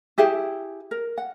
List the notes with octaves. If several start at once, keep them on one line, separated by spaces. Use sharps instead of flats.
E4 G4 G#4 E5
A#4
F#5